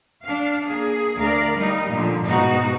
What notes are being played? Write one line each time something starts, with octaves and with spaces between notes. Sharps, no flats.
D4 F5
A#3 G#4
D2 A#4 D5 F5
G3 D#4
A#2 D3 F3
G#2 B2 G#3 D#4 F#4